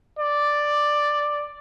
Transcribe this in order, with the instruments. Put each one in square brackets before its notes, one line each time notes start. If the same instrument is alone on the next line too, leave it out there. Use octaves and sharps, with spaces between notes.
[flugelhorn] D5